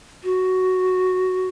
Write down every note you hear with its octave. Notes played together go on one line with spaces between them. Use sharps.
F#4